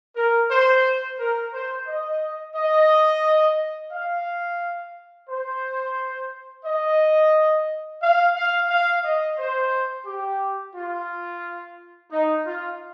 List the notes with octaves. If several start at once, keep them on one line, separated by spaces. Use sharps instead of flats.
A#4
C5
A#4
C5
D#5
D#5
F5
C5
D#5
F5
F5
F5
D#5
C5
G4
F4
D#4
F4